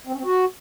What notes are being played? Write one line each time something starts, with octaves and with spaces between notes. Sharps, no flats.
C4
C#4
C4
F#4